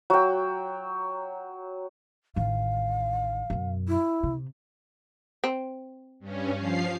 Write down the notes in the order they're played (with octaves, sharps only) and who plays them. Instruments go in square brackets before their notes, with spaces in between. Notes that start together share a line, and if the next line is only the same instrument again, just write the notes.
[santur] F#3 G5
[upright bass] A1 D#3 [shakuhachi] F5
[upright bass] F#2 B2
[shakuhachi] E4
[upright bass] C3
[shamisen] C4
[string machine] G2 C#4
F3 F5 C7